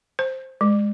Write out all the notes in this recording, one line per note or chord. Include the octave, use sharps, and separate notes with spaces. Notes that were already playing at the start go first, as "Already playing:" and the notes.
C5
G#3